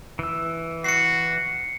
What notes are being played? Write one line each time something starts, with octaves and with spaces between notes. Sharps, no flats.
E3 E6
F#4 C7 C#7